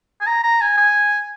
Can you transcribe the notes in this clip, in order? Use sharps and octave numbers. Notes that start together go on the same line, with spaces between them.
G#5
A#5
A#5
G#5
G#5